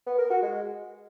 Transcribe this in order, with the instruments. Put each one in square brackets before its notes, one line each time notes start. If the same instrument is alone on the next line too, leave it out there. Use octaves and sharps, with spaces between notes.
[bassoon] B3
A#4
F#4
G#3